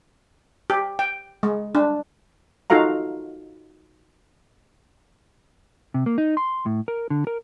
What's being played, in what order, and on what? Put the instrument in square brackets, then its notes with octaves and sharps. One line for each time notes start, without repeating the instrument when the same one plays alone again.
[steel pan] G4
G5
G#3
D4
D#4 F4 F#4 A4 F5 A#5
[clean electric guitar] C3
A#3
D#4
C6
A2
A#4
D3
A#4